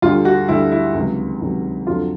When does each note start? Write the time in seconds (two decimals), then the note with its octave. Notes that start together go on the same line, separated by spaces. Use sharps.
0.02 D2 D3 G3 F4
0.25 F#4
0.48 D2 D3 G3 E4
0.72 E4
0.95 C#2 C3 D#3 F#3
1.41 C#2 C3 D#3 F#3
1.87 F2 D3 F#3 F4